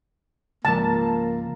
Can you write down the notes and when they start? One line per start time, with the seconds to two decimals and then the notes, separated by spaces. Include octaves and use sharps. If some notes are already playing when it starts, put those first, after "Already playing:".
0.65 C#2 G#2 F3 A#3 A5